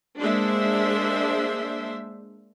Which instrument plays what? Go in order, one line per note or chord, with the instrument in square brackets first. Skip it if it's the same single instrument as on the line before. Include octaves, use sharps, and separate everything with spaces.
[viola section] G#3 A#3 D4 C5 E5